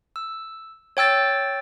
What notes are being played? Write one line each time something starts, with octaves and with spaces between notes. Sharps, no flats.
E6
C#5 G5 E6 A6